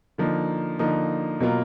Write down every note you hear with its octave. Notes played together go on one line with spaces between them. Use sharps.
D3 F3 A#3 D#4
D3 F3 A#3 D#4
B2 F#3 A#3 F4